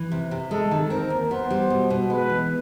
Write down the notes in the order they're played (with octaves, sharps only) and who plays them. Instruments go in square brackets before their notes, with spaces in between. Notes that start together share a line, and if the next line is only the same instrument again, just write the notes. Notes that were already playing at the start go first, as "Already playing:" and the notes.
Already playing: [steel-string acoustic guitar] E3
C3
C3
[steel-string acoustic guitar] G#3 [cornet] A4
[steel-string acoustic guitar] D#3
[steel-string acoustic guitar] C4 [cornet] A#4
[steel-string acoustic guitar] D#2
[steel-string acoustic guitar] B3 [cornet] C5
[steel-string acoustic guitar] G3
B2
B2
[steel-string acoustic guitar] G#3 [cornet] B4
[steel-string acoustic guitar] E3